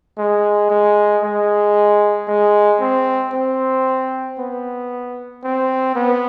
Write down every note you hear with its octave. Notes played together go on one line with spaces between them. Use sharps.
G#3
G#3
G#3
G#3
C4
C4
B3
C4
B3